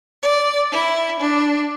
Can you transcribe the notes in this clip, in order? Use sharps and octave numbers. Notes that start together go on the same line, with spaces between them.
D5
E4
D4